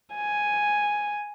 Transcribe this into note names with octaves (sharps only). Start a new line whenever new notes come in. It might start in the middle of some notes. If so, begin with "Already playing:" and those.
G#5